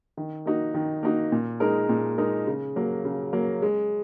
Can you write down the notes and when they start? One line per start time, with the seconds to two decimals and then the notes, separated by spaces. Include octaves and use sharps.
0.17 D#3
0.46 A#3 D#4 F#4
0.74 D#3
1.03 A#3 D#4 F#4
1.32 A#2
1.60 G#3 D#4 A#4
1.89 A#2
2.18 G#3 D#4 A#4
2.47 C#3
2.76 F#3 A#3
3.05 C#3
3.33 F#3 A#3
3.62 G#3